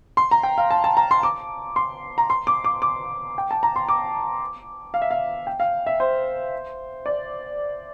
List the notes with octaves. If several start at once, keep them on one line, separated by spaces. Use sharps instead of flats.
C6
A#5
G5
F5
A5
A5
A#5
C6
D6
C6
A#5
C6
D6
D6
D6
G5
A5
A#5
C6
D6
F5
E5
F5
G5
F5
E5
C5
D5